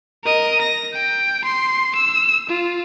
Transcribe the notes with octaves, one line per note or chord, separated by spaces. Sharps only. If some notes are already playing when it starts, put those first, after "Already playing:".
A#4 D#5
A#6
G5
C6
E6
F4